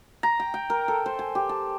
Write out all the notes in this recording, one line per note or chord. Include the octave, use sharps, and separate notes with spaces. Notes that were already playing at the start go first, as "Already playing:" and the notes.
A#5
G5
G5
A#4
A4
C5
G#5
G4
A5